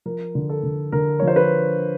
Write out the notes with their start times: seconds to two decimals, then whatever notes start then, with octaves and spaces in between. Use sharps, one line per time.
0.05 F3 A#4
0.35 D3
0.49 A4
0.63 D3
0.92 D3 A#4
1.20 F3 C#5
1.28 C5
1.36 B4